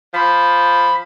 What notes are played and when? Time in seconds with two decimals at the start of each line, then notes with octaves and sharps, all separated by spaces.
0.14 F3 B5